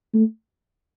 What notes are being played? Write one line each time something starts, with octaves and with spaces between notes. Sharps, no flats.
A3